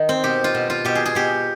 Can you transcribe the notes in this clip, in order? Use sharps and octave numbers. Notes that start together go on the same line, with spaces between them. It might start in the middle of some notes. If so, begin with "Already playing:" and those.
Already playing: D#3 D#4
C4
B2 G4
F4
B2
F4
B2 G4
G#4
G#4
B2 G4